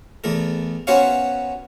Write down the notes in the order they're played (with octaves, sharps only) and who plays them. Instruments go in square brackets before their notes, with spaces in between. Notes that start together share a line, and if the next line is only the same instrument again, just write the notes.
[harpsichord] E2 A3 A#4
B3 C#4 F#4 C5 C#5 F5